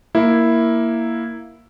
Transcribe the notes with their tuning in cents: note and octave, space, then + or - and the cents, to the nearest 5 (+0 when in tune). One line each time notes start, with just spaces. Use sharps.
A#3 +0 E4 +0